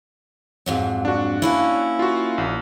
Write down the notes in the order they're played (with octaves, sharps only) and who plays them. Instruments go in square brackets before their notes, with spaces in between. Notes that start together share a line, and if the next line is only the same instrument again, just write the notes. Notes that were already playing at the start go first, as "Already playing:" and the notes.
[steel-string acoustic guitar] F2 G#2 F#3
[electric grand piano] D4 F#4
[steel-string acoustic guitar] A#3 C#4 E4
[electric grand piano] F4 F#4
A#1